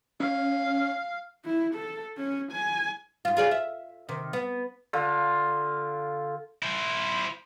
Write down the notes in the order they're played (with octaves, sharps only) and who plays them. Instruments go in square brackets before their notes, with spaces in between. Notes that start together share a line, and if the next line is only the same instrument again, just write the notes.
[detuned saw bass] C#4 [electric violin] F5
[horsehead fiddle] E4
A4
C#4
G#5
[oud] G#2 F4
F4 G#4 D5
E5
C3 D#3
B3
[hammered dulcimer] D3 F4
[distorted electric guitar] E4 C5